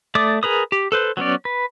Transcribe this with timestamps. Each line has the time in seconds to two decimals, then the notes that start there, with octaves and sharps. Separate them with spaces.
0.15 A3 D5 D6 D#6
0.43 G#4 A#4 B4 D#6
0.72 G4
0.92 A4 B4 C5
1.17 F#3 B3 C#4 D5
1.45 B4